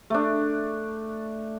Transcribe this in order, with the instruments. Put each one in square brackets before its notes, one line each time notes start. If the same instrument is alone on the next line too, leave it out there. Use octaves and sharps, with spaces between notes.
[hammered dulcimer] A3 D4